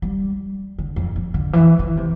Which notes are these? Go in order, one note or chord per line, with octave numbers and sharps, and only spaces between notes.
G3
D3
F2
F2
D3
E3
E3
C3